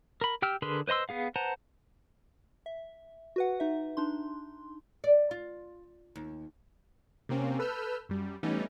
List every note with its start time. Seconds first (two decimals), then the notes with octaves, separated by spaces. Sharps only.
0.21 A#4 B5
0.42 G4 G5 E6 F6
0.62 D3 G#4 A#4 B4 C6
0.88 B4 C5 D#5 C6 E6
1.09 B3 G#4 F5
1.36 B4 C5 F#5 A5 A#5
2.66 E5
3.36 F#4 B4 F#5
3.60 D#4 E5
3.97 D4 D#4 C6
5.04 D5
5.31 F4
6.16 D#2
7.29 C3 A#3 C4 C#4
7.59 A4 B4 E6 F6 G6
8.09 F#2 G3
8.43 E3 G3 A3 B3 C#4 D#4